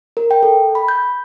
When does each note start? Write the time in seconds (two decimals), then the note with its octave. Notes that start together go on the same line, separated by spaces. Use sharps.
0.17 A#4
0.31 G5
0.43 A4
0.75 B5
0.88 G6